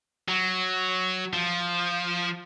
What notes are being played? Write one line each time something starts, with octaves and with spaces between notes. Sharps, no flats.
F#3
F3